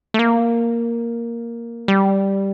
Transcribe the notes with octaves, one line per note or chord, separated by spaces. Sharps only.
A3
A#3
G3